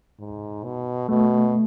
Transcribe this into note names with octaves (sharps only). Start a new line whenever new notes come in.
G#2
B2
B2 A3